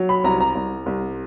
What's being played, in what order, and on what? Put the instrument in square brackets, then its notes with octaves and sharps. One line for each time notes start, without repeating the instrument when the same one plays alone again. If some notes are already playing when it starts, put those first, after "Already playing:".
Already playing: [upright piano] F#3
B5
C2 A#5
A#5
C2
C2